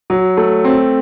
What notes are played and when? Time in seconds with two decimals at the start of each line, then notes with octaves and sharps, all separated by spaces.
0.10 F#3
0.37 A3
0.64 C4